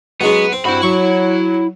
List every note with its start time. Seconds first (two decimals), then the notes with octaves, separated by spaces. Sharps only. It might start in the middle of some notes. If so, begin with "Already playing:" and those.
0.21 F#3 G#3 B3 C#4
0.52 C4
0.65 G2 C4 E4 F#4 B5
0.82 F#3 C#6